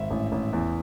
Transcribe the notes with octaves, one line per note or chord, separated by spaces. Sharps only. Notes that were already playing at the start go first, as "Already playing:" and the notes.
Already playing: G#1 E5
A1
A1
E2